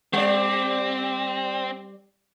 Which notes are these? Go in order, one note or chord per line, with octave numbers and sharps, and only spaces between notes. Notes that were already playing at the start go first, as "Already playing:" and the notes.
G3 C4 D5